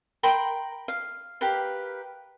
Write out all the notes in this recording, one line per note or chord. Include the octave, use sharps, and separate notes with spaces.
A#4 G5 B5 C6
F5
G4 A#4 B4 F5